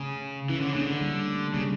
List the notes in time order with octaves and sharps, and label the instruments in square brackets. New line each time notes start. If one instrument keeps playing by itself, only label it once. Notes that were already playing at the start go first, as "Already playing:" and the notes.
Already playing: [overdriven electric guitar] C#3 [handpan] A3 C#4
[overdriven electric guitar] E3 [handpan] C#4 E4
[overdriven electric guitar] D3
[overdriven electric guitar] C#3 [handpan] A#3 D4
[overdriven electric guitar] D3
[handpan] G3 A#3
A3
[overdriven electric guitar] C#3 [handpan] G3 A#3